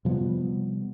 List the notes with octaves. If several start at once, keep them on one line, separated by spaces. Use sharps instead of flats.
C3 F3 G3 B3